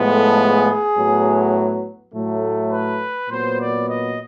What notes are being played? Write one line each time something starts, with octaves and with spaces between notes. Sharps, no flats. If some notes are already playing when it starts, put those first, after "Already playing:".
Already playing: A2 F3 G#3 B3
A4
G#4
A2 F#3 B3
A2 F#3 A3
B4
A#2 F#3 B3 C5
D5
D#5